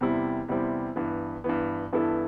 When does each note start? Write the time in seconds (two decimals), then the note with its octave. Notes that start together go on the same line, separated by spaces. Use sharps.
0.01 E2 C3 G3 C4 E4
0.48 E2 C3 G3 C4 E4
0.96 G2 E3 B3
1.44 G2 E3 B3
1.93 G2 E3 B3 E4 A4